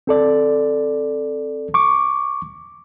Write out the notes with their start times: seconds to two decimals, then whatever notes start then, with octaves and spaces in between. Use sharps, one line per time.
0.07 C4 A4 D5
1.74 C#6 D6